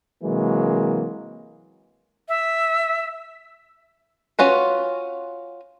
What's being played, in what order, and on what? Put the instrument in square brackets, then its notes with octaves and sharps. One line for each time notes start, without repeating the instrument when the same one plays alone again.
[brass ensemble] C3 E3 F#3 G#3 A#3
[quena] E5
[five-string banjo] C#4 F4 F#4 B4